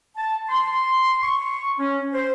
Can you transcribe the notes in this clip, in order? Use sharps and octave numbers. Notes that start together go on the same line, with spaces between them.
A5
C6
C#6
C#4
C5